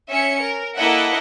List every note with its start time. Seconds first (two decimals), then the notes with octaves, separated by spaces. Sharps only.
0.11 C#4 E5 C#7
0.43 A#4
0.77 A#3 E4 A4 D#5 E5 F#5